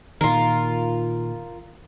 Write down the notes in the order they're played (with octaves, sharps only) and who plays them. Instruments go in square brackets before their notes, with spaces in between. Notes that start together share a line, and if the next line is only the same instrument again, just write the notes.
[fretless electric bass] A#2 D#3 [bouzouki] F4 A#4